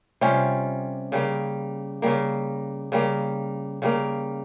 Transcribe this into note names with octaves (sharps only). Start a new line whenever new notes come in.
C3 G3 C#4 F4
C#3 G3 A#3
C#3 G3 A#3
C#3 G3 A#3
C#3 G3 A#3